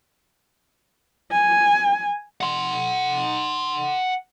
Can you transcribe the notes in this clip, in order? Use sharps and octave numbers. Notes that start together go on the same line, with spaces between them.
G#5
F#5 C6